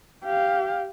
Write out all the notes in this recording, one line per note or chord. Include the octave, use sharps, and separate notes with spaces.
G4 F5